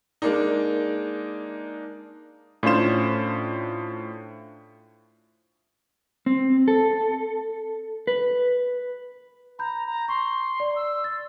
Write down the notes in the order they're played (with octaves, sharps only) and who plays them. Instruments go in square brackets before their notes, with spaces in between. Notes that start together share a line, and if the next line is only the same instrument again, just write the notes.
[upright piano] G#3 A#3 D4 D#4
[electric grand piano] A2 C#4 D4 F4 C5 E7
[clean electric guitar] C4
A4
B4
[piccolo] A#5 [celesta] B5 G6
[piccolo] A#5
[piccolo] C6 [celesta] C#6
[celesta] D5
[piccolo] E6
[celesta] A6